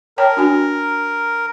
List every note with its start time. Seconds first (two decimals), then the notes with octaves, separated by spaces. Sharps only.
0.18 A#4 C#5 G5 A5
0.37 D4 F#4 G#5